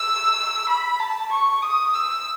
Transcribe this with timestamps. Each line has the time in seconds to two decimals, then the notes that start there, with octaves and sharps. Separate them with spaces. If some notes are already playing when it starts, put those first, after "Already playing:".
Already playing: E6
0.69 B5
1.00 A5
1.31 C#6
1.62 D#6
1.94 E6